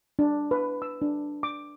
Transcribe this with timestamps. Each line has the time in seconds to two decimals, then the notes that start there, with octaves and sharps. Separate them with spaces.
0.19 D4
0.51 B4
0.82 E6
1.02 D4
1.43 D6